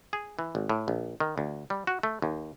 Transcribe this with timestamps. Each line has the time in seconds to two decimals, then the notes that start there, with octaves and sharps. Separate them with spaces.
0.13 G#4
0.39 E3
0.55 G#1
0.69 A2
0.88 A#1
1.20 D#3
1.38 D2
1.70 G3
1.87 F#4
2.03 A3
2.22 D#2